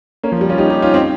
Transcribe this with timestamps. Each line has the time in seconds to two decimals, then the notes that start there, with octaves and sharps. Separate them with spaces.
0.23 A#3 C#4
0.32 F3
0.41 G3
0.49 C#4 F4
0.58 D#4 G4
0.70 D#4 G4
0.82 C#4 F4
0.94 C4 D#4